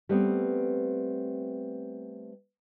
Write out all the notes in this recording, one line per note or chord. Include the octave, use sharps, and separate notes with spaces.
G3 A3 B3 C4